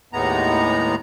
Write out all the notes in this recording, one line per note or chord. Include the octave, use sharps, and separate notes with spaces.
D#2 A2 G#3 B3 A#5